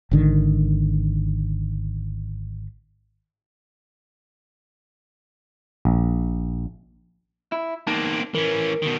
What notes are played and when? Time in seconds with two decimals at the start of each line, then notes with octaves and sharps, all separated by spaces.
0.11 G#1 D3 D#3
5.85 A#1
7.52 E4
7.87 E2 A#3 C4 D#4 A5
8.35 E3 C#4 A#4
8.82 B2 D#3